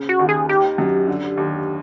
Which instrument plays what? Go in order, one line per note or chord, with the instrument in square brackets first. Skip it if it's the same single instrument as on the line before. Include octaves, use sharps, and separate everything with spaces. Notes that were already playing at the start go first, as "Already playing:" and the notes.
Already playing: [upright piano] C#3
[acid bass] F#4
[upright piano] D#2
[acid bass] G#4
[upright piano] D#3 [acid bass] G4
[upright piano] F#2
D3
D#2